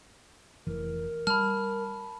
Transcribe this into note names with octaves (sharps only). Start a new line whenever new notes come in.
F1 E3 A#4
G3 A5 B5 F6